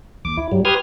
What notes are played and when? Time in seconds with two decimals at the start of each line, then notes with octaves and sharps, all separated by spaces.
0.25 D#2 D6
0.37 E4
0.52 G2 F#3 G3
0.65 G4 B4 C6 D#6 F6 G#6